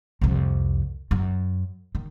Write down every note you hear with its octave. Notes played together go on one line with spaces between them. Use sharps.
C2 F2
F#2
D#3